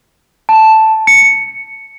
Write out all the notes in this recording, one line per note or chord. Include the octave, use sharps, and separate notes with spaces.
A5
C#7